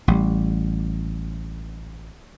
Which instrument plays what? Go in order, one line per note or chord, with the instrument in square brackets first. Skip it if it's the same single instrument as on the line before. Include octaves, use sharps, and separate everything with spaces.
[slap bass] A1 G3